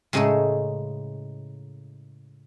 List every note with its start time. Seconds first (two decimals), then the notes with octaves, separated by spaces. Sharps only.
0.13 A2 C#3 G#3 D#4 G#4 A4